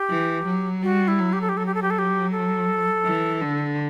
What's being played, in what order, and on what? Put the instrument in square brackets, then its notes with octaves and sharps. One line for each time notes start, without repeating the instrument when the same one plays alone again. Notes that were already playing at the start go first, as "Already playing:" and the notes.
Already playing: [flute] G4
[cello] E3
F#3
[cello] G3 [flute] F#4
[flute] E4
[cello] F#3
[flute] G4
A4
G4
[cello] F#3 [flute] A4
[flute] G4
A4
G4
A4
G4
A4
[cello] E3
D3